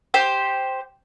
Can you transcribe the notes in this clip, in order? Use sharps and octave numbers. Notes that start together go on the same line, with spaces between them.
G4 C5 G5